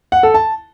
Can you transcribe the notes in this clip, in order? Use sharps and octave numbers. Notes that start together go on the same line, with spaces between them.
F#5
A4
A5